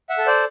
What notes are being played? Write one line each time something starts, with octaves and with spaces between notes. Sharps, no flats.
E5 F#5
A4
C5 D5